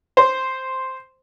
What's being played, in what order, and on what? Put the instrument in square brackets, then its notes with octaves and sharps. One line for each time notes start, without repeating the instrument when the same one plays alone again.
[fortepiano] C5